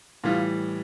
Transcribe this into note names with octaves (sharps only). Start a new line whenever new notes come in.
A2 E3 G3 F4